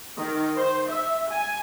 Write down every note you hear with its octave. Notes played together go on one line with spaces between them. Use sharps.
D#3
C5
E5
G#5